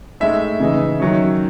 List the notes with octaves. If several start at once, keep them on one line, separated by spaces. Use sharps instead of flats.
A2 G#3 D#4 E5
C#3 E3 G#3 D#4
D#3 F#3 C#4